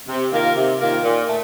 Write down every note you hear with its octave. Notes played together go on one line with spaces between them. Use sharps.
C3
D#3 A#3 F4 A#4
C3
D#3 A#3 F4 A#4
A#2
A3